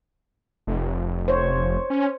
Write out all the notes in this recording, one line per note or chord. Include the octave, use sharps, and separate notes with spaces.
F1
C5 C#5
C#4